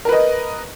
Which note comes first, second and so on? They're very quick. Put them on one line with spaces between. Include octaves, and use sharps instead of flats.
A#4 B4 D#5